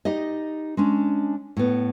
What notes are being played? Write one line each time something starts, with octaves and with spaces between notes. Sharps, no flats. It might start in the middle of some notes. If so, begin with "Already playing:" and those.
D#4 G4 D5 D#5
G#3 C#4 D4
A2 B3